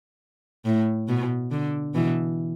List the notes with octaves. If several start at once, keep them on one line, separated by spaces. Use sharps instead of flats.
A2
B2
D3
B2 E3